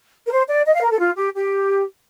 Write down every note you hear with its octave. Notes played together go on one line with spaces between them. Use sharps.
A#4
C5
D5
D#5
F5
A#4
A4
F4
G4
G4